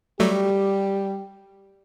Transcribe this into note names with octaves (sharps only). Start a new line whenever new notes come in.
F#3 G3 A3 G4